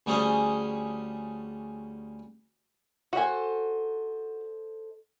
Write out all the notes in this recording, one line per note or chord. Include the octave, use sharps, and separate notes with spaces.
D2 G3 C#4 G#4 C5 C6
F#4 A4 C5 D#5 G#5